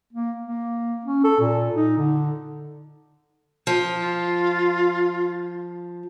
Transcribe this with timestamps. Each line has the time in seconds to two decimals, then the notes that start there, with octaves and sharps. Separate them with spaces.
0.13 A#3
0.45 A#3
1.05 C#4
1.24 A4
1.40 A#2
1.75 D#4
1.98 D3
3.67 F3
3.99 F4